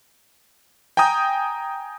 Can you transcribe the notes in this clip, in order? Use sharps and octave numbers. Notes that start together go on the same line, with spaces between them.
G5 G#5 A#5 D#6 G6